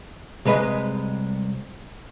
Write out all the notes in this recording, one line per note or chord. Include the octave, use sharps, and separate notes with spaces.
C2 G#3 B4 D#5